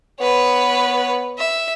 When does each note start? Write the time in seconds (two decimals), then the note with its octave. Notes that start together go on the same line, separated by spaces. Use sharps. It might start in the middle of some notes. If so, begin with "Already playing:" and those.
0.20 B3 B4 C#5
1.38 E5